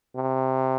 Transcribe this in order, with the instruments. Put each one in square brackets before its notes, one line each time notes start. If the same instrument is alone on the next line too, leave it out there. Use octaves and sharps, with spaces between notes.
[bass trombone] C3